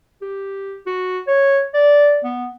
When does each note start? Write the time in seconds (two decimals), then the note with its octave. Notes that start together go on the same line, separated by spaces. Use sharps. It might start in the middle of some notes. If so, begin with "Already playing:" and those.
0.21 G4
0.86 F#4
1.27 C#5
1.74 D5
2.24 B3